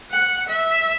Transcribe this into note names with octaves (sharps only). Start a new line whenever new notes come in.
F#5
E5